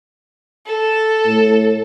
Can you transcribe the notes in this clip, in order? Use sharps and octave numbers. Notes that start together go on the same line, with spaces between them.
A4
A2